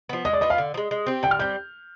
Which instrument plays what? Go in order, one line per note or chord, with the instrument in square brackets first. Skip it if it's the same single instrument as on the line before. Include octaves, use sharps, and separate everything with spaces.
[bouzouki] F3 B3
[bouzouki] G#3 [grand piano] D#5
[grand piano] D5
[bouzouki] B3 F4 [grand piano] D#5
[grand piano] F5
[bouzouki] D3
F3
G#3
G#3
C4 G4
[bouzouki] D3 [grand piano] G5
[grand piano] F6
[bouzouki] G3 C4 [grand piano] G6